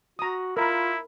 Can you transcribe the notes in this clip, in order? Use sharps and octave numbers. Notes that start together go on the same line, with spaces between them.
F#4 A#5 D#6
E4 F4 A#4 B5